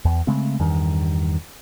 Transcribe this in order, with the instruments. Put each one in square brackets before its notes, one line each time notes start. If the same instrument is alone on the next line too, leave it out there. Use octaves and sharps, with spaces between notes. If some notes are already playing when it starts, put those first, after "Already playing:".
[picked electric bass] E2
C#3 G#3 A3 C4
E2 G2 D#3